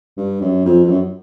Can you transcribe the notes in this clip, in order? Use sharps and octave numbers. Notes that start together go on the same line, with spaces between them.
G2
F#2
F2
F2
F#2